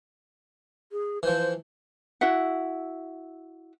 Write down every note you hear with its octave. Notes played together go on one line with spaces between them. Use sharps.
G#4
E3 F3 C5
E4 F#4 E5 F#5